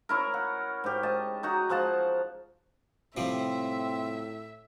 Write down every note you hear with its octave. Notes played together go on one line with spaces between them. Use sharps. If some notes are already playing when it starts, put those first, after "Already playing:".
C#4 E4 A#4
F#5
G#2 G4
D#5 A5
D#4 F#4 A#5
F3 G#3 F#5 A5
A2 C3 F3 G3 C4 E5